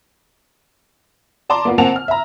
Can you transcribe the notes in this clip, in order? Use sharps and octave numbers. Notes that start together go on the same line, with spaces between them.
D5 A5 A#5 C6 D6
A#3 B3 F4
A#3 C4 F#5 G#5 A5 F7
F6
E5 A#5